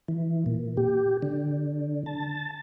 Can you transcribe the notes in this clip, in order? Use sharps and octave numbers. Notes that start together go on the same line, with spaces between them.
E3
A#2
G4
D3
A5